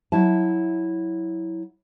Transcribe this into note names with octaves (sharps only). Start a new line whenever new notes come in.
F#3 E4 E5 A5